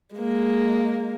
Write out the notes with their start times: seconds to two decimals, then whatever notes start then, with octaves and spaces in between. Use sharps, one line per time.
0.15 G#3 A#3